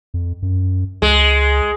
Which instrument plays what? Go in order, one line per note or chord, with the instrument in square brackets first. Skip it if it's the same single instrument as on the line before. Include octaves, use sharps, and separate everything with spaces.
[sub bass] F2
F#2
[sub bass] C#2 [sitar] G#3